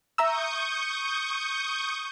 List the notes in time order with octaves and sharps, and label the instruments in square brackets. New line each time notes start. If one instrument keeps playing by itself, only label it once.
[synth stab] E5 A#5 E6 [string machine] C#6 D#6 G6